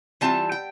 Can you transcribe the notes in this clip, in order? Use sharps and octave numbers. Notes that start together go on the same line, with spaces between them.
E3 G3 C4 F4 A5
G5